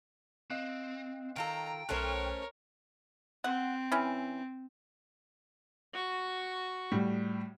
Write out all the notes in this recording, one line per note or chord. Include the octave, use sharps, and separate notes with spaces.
C4 D#5 F5 F#6
D#3 F4 A4 G5 A#5
B1 A3 C#4 A4 A#4 C5 C#5 F#6
C4 F#5
E3 C#4
F#4 C#6
A2 G3